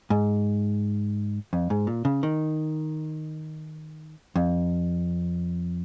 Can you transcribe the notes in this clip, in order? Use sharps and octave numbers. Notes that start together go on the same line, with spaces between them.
G#2
F2
G#2
A#2
C#3
D#3
F2